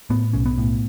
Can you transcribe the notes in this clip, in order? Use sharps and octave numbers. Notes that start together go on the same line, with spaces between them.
A2 B3
B1 C#4
B3
A2